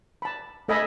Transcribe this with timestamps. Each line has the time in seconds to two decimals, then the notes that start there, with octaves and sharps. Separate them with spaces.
0.22 A5 B5
0.68 A3 A4 D#5 E5 G#5 B5